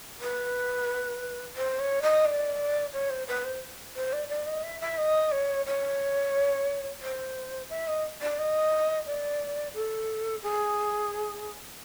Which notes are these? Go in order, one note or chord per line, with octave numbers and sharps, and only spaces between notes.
B4
C5
C#5
D#5
D5
C#5
C5
B4
C5
C5
D5
D5
D#5
E5
E5
D#5
C#5
C#5
C5
E5
D#5
D5
D#5
D5
A4
G#4